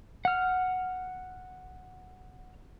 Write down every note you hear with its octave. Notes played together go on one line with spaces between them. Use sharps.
F#5 F6